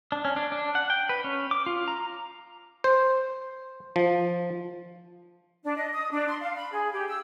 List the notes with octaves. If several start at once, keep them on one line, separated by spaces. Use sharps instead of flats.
D4
C#4
D4
D4
F#5
G5
B4
C#4
D6
F4
A#5
C5
F3
D4
D#5
D#6
D4
C6
F5
B5
G#4
G4
E6